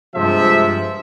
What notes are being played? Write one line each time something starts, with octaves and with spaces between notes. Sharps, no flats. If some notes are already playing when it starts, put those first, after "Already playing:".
G2 C3 F3 G#3 E5